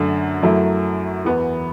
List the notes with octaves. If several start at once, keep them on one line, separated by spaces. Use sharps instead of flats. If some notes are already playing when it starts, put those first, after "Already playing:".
Already playing: F#2 D3 A3
F#2 F#3 A3 E4
E2 E3 B3